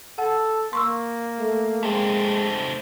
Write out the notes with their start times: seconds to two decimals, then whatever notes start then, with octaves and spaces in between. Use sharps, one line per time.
0.18 A4 F#5
0.73 A#3 C6 C#6 E6
1.39 A3
1.83 G#3 A3 C4